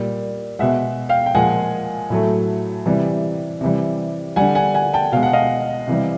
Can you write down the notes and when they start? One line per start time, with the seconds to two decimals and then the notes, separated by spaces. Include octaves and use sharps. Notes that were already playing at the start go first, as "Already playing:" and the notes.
Already playing: A#2 G3
0.59 B2 G#3 E5 F#5
1.09 F5 G5
1.26 G5
1.35 A#2 F3 G#3 F#5 G#5
2.10 A2 F#3 A3
2.86 C3 E3 G3
3.61 C3 E3 G3
4.36 D3 G3 F#5 G#5
4.55 F#5 G#5
4.74 F#5 G#5
4.94 G5 A5
5.12 B2 G#3 F5
5.23 F#5
5.33 D#5 F5
5.88 C3 E3 G3